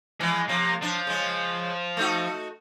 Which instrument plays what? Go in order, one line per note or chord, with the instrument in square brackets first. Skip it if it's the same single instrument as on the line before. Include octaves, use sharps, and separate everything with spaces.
[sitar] E3 F3 [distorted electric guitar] G#3
[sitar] C3 F3 [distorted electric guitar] A#3
[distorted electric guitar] F3 [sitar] D4
[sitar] C#3 G#3
A3 D#4 F#4